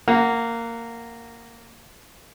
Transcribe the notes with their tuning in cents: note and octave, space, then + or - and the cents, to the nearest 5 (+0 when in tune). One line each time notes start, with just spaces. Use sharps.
A#3 -15 F#5 +10 A#5 +15